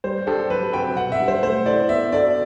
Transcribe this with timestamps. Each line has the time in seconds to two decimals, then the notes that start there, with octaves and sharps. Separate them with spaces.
0.04 G3 C5
0.27 D4 G4 A4 C5
0.50 F#3 B4
0.73 C4 F#4 B4 G5
0.96 B2 F#5
1.12 E5
1.19 G3 D4 G4
1.28 C5
1.42 A3 C5
1.66 E4 A4 C5 D5
1.89 B3 E5
2.12 D4 F#4 A4 D5